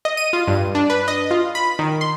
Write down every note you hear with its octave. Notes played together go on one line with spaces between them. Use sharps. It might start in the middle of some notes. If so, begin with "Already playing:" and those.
D#5
D#7
F4
G2
D4
B4
D#5
F4
B5
D#3
C6